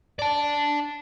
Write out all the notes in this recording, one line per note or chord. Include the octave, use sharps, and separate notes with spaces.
D5 A5